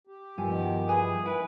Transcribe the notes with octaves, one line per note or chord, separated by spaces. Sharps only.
G4
G2 B2 D#3 F3 E4 G4 G#5
E3 G#4 B4 G#5 B5
E4 B4 E5 G#5